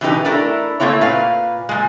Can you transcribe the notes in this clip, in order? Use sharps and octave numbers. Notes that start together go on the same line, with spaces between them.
B2 E3 D4 D#4 G4 B4
A3 D4 E4 A4 A#4
A3 A#3 C4 E4 C#5
A#2 B4 F5
A#2 G#3